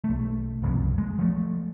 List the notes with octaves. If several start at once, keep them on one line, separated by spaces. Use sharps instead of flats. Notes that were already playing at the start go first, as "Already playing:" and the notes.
B1 A3
F#1 C2 F2
G#3
F3 A3